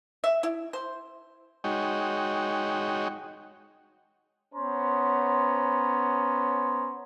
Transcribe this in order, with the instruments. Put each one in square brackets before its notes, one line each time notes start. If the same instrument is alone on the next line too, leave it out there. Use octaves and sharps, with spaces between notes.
[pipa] E5
E4
C5
[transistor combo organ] G#3 D#4 F#4 C#5 G5
[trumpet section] B3 C#4 C5 A#5